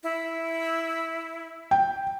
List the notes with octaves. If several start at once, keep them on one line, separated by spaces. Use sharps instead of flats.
E4
G5